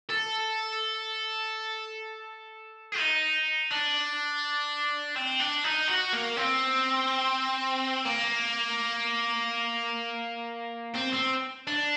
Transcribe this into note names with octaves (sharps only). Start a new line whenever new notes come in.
A4
D#4
D4
C4
D4
D#4
F#4
A#3
C4
A#3
C4
C4
D4